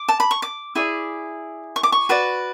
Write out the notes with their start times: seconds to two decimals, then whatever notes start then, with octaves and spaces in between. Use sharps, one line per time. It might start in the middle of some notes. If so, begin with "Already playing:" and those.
Already playing: D6
0.08 A5
0.20 B5
0.31 C#6
0.42 D6
0.75 E4 G#4 D5
1.76 C#6
1.83 D6
1.92 C#6
2.09 F#4 B4 D5